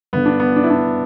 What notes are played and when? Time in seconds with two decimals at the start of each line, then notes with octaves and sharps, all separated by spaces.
0.13 G2 D3 B3
0.26 D4
0.40 B3
0.56 D4
0.64 E4
0.70 D4